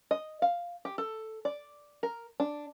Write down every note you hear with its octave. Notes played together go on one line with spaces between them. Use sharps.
D#5
F5
G4
A4
D5
A#4
D4